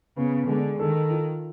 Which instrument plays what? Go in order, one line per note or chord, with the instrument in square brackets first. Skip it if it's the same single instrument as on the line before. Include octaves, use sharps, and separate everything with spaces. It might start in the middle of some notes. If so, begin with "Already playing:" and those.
[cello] C#3 [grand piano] B3
[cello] D3 [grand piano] G#3
[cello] D#3 [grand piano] A4
[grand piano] F4